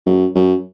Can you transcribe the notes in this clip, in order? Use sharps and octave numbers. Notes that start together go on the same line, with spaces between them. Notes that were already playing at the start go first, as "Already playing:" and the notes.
F#2
F#2